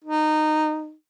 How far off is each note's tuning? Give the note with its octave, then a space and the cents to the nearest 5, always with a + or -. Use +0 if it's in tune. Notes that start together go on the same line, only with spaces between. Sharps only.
D#4 -15